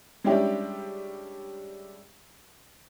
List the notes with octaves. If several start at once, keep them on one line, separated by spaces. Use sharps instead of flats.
G3 G#3 C#4 D4 E4 G4